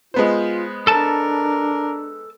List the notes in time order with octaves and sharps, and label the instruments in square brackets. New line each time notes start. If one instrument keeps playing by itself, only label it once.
[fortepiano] G#3 B3 C5 [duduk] F4
[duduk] D4 [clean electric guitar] A4 A5 [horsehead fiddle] A#4